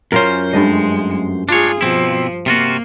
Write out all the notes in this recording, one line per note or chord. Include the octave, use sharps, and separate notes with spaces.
F#2 C#4 F4 A#4 C5
G2 G#3 A3 D#5
D4 F4 G#4 C#5
B2 F3 C4 E4
C3 A#3 F4 F#4